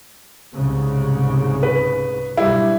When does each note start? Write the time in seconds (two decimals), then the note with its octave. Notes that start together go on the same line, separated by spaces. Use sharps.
0.53 C2 G#2 C#3
1.63 B4
2.37 B1 G2 G3 E4